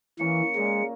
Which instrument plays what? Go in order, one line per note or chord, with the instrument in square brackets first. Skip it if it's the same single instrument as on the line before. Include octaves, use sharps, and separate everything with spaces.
[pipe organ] E3 [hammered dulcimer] A#3 C#4 [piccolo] C#7
[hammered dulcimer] A#2 A#4 [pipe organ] G#3